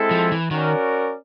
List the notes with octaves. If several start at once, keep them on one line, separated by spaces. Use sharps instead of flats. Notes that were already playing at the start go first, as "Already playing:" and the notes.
Already playing: G#3 C4 E4 A4
F3
E3
D#3 C#4 F#4 A#4 D5